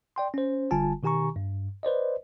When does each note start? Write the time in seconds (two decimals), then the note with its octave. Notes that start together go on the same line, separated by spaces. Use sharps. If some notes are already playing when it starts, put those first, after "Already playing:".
0.16 D5 G5 C6
0.34 C#4 C5
0.71 G1 D3 G3 F4 G#5 A5
1.03 B2 D#3 G4 G#5 A#5 C#6
1.36 G2
1.83 B4 C5 D5 D#5